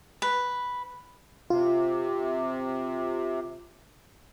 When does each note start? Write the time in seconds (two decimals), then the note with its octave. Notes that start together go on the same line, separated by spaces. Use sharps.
0.22 B4
1.50 C3 F4